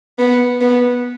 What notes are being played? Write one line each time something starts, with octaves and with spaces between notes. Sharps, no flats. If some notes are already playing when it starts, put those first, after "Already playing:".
B3
B3